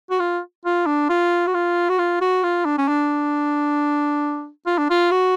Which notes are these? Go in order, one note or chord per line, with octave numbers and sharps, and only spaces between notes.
F#4
F4
F4
D4
F4
F#4
F4
F#4
F4
F#4
F4
D4
C#4
D4
F4
D4
F4
F#4